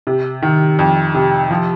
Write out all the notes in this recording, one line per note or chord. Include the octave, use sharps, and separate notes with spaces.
C3
D#3
F2
C3
F3